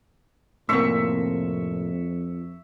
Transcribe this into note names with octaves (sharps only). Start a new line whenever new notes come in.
F2 A2 C3 A#3 E5 C#6